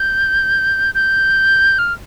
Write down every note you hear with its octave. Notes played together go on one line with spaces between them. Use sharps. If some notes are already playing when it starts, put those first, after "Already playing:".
Already playing: G6
G6
F6